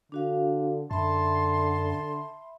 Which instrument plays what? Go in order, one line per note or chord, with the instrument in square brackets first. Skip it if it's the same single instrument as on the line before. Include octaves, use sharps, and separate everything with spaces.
[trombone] D3 [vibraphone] D4 F#4 F5
[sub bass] F#2 [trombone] D3 [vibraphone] E5 B5 [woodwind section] A5 C6